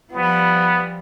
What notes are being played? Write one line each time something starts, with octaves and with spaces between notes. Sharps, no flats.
F3 G3 B3